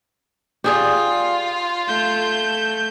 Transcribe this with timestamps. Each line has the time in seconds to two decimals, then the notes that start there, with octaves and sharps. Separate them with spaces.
0.64 F4 G4 G#4 D5
1.88 A3 G6